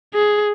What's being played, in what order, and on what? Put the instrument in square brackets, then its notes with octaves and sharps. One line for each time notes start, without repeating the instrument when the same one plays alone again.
[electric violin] G#4